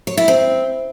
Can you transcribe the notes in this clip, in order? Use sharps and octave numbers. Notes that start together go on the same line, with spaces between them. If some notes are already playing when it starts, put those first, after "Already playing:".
C#5
E4
C4